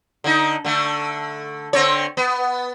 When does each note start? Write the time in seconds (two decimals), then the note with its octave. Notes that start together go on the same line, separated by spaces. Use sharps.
0.24 D3 D#4
0.65 D3 A3
1.73 D3 C4 C#5
2.17 B3